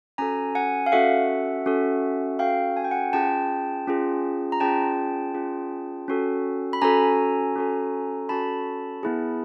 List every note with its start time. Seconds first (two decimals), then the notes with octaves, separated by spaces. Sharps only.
0.18 C#4 F#4 A4 G#5 A#5
0.55 F#5 G#5
0.86 F5
0.92 C#4 F#4 A4 E5 F#5
1.66 C#4 F#4 A4
2.39 C#4 F#4 A4 F5 G5
2.77 G#5
2.84 G5
2.91 F#5 G#5
3.13 C#4 F4 G#4 G5 A5
3.88 C#4 F4 G#4
4.52 A#5
4.60 C#4 F4 G#4 G5 A5
5.34 C#4 F4 G#4
6.08 C#4 F#4 A4
6.73 B5
6.82 C#4 F#4 A4 G#5 A#5
7.56 C#4 F#4 A4
8.29 C#4 F#4 A4 A5 B5
9.03 B3 E4 G#4